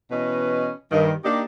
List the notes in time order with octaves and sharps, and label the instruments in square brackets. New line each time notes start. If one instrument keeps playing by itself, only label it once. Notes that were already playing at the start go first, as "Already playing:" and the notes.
[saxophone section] B2 E3 C#4 B4 D#5
G2 D#3
A#3 D4 D#4 G4